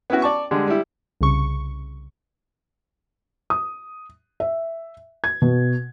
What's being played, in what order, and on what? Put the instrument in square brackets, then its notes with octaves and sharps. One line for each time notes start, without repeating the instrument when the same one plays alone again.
[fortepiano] B3 C#4 E4 F#4
D5 A5 C#6
D3 G3 G#3 D4
G3 E4
[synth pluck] C2 C#3 C#6
[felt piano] D#6
E5
G#6
B2